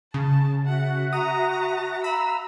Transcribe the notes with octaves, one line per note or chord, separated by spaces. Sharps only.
C#3 A5
F#4 E5 F#5
A#5 D#6
F5 A#5 B5 E6